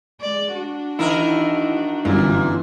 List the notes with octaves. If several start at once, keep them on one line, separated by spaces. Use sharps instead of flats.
G#3 D5
D4 F#4
D#3 E3 E4 A#4
G1 F#2 A#2 E3